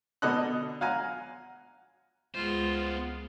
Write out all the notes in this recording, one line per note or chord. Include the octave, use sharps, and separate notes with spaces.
B2 D3 A4 D#5 F#5 F#6
F5 F#5 G#5 A#5
C#2 G#3 B3 F4 C5